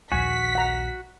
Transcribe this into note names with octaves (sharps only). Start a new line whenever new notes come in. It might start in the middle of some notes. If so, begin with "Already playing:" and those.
A#1 D#2 F#4 G#5 B6
F#5 A#5